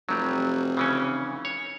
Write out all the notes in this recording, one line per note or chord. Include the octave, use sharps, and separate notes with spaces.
F1 F#3 G3
C#3 E3 C#4
C#5